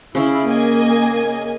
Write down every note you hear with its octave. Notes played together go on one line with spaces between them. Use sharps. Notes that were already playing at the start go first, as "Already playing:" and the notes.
C#3 C#4 E4
A#3 D#5 G#5